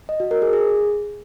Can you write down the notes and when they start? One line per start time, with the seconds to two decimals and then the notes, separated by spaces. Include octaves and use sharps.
0.09 D#5
0.20 F#4
0.31 A#4
0.42 G#4
0.53 G#4